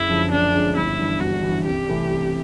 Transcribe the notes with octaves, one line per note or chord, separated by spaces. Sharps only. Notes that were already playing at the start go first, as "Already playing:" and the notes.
Already playing: F#1 E4
F#2 D3 F3 G#3
F#1 D4
F#2 D3 F3 G#3
G1 E4
G2 E3
G1 F#4
G2 E3
C2 G4
C3 E3 A3